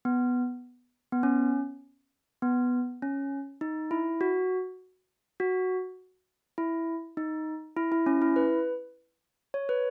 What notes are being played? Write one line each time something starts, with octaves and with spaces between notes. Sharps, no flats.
B3
B3
C#4
B3
C#4
D#4
E4
F#4
F#4
E4
D#4
E4
E4
C#4
E4
B4
C#5
B4